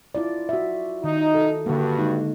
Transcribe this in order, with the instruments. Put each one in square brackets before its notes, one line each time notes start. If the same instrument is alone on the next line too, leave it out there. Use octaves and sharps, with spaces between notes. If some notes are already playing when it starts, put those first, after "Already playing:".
[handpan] E4 F4 D5
F#4 E5
[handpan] D#3 [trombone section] D#4
[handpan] A4
[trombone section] G2 F#4 [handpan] D3 A#3
[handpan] G#3 D#4